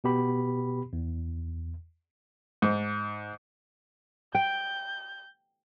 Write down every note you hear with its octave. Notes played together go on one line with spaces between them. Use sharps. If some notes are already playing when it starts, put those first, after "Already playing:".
B2 B3 G4 B5
E2
G#2
G5 G6